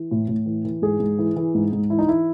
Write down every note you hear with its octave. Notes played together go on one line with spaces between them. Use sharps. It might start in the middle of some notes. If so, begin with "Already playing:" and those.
Already playing: E3
A2
A2
E3
E3
G#2 G#4
G#2
E3
E3
G#2
G#2
E3 E4
D#4
E3 E4